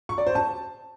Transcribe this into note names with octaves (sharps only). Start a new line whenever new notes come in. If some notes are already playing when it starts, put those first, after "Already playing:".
C#6
D5
C5
A5